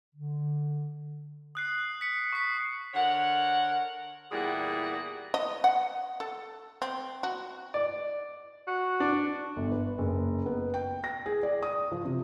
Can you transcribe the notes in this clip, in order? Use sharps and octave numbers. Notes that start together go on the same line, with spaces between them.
D3
D#6 F#6 C7
B6 C#7
C#6 D#6 B6 C7
D3 A#4 C#5 F#5
E2 A#2 G3 E4 G#4 F#5
D#5
F#5
A4
C4
F#4
D5
F#4
D4
G1
B4
F#1
B3
G5
A#6
G#4
D5
D#6
F3
C3